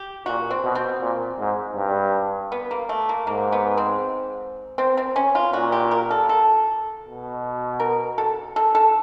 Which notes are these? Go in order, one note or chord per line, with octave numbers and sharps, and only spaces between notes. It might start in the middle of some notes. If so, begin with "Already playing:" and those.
Already playing: G4
A#2 F#4
C4
B2
C4
A#2
G#2
G2
B3
A#3
A3
A#3
G#2 A#3
B3
C4
C4
C4
C#4
F4
A#2 F#4
G4
A#4
A4
A4
B2
A#4
A4
A4
A4